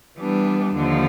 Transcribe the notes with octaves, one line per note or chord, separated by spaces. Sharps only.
E3 G3 B3 D4
D#2 D3 F3